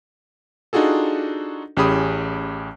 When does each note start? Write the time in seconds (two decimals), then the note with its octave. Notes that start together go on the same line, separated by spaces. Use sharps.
0.73 D4 D#4 F4 F#4 G#4 A4
1.77 A1 C#4 G4 G#4 B5 D#6